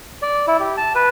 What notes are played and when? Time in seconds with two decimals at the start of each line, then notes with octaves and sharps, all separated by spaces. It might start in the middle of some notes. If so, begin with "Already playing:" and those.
0.22 D5
0.48 E4
0.60 G4
0.77 A5
0.95 B4